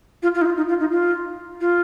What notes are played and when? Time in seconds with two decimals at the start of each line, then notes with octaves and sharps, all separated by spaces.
0.22 F4
0.34 F4
0.41 D#4
0.45 F4
0.57 D#4
0.68 F4
0.80 D#4
0.91 F4
1.60 F4